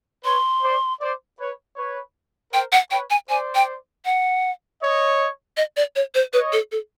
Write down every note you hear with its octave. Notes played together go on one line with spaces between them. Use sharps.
B4 C#5 C6
C5 D5
C5 D5
B4 C#5
B4 C#5
A#4 C5 G5
F#5
B4 C#5 G5
G#5
C5 D5 G#5
G5
F#5
C#5 D#5
D#5
D5
C#5
C5
B4 C#5 D#5
A4
A4